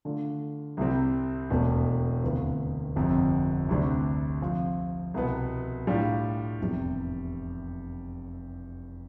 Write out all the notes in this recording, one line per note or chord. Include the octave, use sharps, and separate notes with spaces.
D3 A3 D4 F4
C2 C3 G3 C4
E1 E2 B2 A3
D2 C3 E3 B3 F4
G1 F2 C3
D2 C3 G3 D4
C3 F3 C4 F4
C2 B2 B3
A2 G3 D4 F4
F1 E2 C3 G3